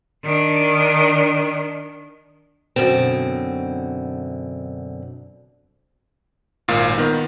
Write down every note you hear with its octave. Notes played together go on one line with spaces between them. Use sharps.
D#3 D4
F#2 B2 D3 C4
G#1 A#2 F5
D#3 B3